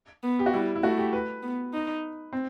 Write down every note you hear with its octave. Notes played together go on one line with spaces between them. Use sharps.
B3
G4
F#4
G3 E4
E4
A3 F#4
G4
B4
B3
D#4
C4